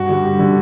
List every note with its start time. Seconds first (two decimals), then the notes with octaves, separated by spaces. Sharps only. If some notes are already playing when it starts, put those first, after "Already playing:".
Already playing: G2 F#4
0.09 D3 G3
0.24 G2 G4
0.39 D3 G3